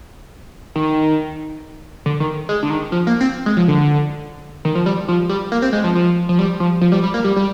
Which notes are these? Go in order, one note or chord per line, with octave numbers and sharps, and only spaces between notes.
D#3
D3
D#3
G#3
D3
D#3
F3
A#3
C4
G#3
F3
D3
D#3
F3
G3
F3
G3
A#3
C4
G#3
F3
F3
F3
G3
F3
F3
G3
G3
A#3
G3
G3